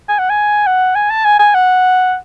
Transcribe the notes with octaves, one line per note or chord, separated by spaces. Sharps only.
G#5
F#5
G#5
F#5
G#5
A5
G#5
G#5
F#5